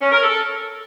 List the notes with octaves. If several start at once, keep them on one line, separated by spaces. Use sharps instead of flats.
C#4
A#4
A4